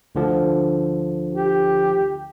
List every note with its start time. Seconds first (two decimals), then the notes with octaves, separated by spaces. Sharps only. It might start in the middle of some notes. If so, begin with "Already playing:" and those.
0.15 D2 D3 F3
1.32 G4